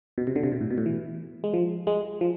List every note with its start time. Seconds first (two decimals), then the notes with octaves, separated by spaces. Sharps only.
0.18 B2
0.27 C3
0.36 D3
0.43 C3
0.52 B2
0.61 A2
0.71 B2
0.78 A2
0.86 E3
1.44 G#3
1.54 F3
1.87 G#3
2.21 F3